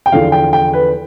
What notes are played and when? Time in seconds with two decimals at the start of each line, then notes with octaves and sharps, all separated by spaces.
0.06 G5
0.12 E2 D3 F3 F5
0.32 G5
0.53 G5
0.74 B4